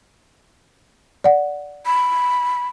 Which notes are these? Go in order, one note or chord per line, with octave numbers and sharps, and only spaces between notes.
D5 F#5
B5